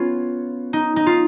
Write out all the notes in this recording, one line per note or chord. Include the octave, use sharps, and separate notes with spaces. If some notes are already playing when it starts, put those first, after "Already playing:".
Already playing: B3 C#4 F4
D#4
D#4
F4